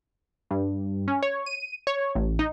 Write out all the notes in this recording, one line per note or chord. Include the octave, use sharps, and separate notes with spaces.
G2
C#4
C#5
D#7
C#5
A1
D#4